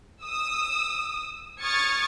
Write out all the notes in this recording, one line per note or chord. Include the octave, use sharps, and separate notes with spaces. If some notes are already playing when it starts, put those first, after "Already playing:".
D#6 E6
C#6 D#6 F6 G#6 A6 C#7